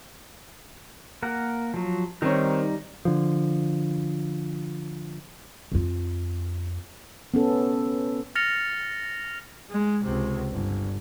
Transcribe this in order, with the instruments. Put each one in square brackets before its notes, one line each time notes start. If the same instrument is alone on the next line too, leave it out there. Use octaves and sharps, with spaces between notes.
[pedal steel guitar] A#3 A#4 F#5
F3 F#3
[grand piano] D#3 C4 C#5 [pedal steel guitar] G3 D#4
[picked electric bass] D3 F3
[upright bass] F2 F4
[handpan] B3 C#4 A4
[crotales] F6 A6 A#6 C#7 F7
[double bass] G#3
C#2 C3
G1